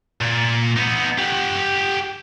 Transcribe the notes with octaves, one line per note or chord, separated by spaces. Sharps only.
A#2
B3 D#4
G4 F#5